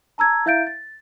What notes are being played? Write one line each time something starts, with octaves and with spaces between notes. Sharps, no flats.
A5 A#5 E6 G#6
E4 E5 F5 G6 A6 D7
A6